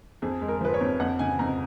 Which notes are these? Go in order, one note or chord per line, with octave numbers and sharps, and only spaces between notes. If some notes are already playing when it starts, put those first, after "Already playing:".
F2 G#4
G#3
A#4
F3 B4
C#5
F2
F2 F#5
C#3 G#5
F2 A#5